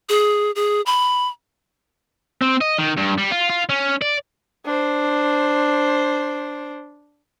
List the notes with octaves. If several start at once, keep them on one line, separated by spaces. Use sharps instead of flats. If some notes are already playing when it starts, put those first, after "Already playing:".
G#4
G#4
B5
C4
D#5
D#3
G2
G3
F4
F4
C#4
D5
D4 C5